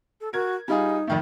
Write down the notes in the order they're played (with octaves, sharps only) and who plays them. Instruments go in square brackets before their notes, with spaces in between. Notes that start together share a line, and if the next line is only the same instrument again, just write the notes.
[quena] A4
[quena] F#4 [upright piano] A#4 G#6
[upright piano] G3 F4 G#4 [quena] D#4
[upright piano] F2 D#3 A3